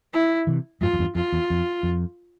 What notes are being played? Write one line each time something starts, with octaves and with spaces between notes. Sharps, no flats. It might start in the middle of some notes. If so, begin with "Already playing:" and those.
E4
C3 E3
F2 G#2 F4
F2
E2 G2
F2 F4
E2
F2
F2